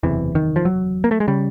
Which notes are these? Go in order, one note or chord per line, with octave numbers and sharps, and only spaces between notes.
F#1 E2 C3 E3
D#3
F3
F#3
A#3
A3
G#3
C#3 G3